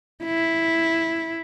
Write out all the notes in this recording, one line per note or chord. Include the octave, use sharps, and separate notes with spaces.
E4